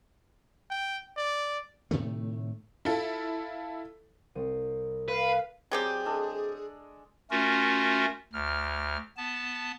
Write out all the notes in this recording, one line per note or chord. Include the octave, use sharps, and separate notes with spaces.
G5
D5
A2 C3 D#3 A3
E4 F4 A4
C2 C5 D#7
B4 F5
F#3 C4 G4 G#4 D5 G#5
G#3 D4 A4
A3 C#4 F4 F#4 A#4
D2 F6
B3 A5